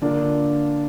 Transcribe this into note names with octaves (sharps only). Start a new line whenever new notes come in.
D3 A#3 D4 F4